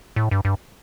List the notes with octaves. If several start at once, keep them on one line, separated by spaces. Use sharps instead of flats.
A2
G2
G2